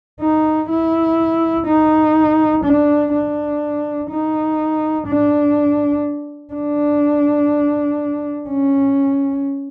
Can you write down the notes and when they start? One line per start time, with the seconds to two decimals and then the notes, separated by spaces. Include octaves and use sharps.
0.21 D#4
0.70 E4
1.67 D#4
2.64 D4
3.13 D4
4.10 D#4
5.08 D4
6.53 D4
8.49 C#4